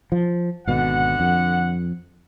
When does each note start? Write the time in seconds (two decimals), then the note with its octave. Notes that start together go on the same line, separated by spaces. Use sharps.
0.12 F3
0.67 G#1 B2 D3 F#5
1.20 F2